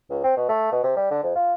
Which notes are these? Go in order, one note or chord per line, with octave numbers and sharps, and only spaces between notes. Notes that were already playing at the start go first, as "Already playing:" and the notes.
C#2
C4
B2
A3
B2
C3
G3
D3
F2
F4